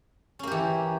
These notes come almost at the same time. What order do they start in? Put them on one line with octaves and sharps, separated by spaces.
C#4 A#3 G4 E3